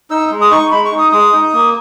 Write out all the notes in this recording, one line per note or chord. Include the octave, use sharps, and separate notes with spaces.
D#4 E6
G#3
D#6
D#4 C#6
G#3 B5
C#6
D#4
D#6
G#3 D#6
D#4
A#3